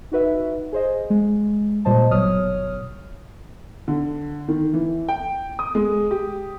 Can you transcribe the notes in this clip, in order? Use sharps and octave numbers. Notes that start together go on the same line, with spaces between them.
D#4 F#4 B4 E5
G#4 C5 D#5
G#3
A#2 G3 C5 D#5 A5
G1 B2 F#3 C#5 D#6 F6
D3
D#3
E3
G5
D#6
G#3
G4